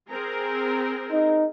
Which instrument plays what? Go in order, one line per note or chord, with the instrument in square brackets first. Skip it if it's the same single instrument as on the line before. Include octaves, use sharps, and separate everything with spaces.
[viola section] C4 G#4 A#4
[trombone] D#4